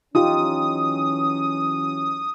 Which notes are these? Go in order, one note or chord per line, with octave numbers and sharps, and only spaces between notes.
E3 F#3 C#4 D#4 F4 G4 D#6